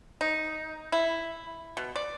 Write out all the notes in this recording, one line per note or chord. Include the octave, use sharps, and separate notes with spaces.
D#4
E4
B2
D5